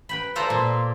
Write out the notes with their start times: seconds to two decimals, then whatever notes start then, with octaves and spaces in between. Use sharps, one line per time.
0.09 B4 G5 B5
0.35 F4 A4 C5 D5 A#5 C6
0.50 A#2